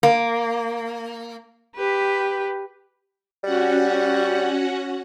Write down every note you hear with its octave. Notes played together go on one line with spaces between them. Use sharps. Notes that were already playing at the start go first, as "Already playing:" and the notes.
A#3
G4 B4
G3 C#4 F#4 F#5